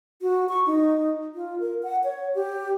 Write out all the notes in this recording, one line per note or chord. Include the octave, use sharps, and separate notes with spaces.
F#4
C#6
D#4
F4
A#4
F#5
C#5
G4